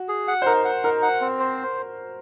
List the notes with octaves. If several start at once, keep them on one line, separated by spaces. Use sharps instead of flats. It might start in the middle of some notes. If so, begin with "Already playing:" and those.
Already playing: F#4
G#4
F#5
C5
D#4 A#4
F#5
D#4 A#4
F#5
C4
C5